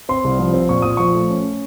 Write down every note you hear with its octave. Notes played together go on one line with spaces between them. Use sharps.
C4 C6
C2
F3
C4
A#2 C#6
A#2 D#6
F3 C#6
A3
C#4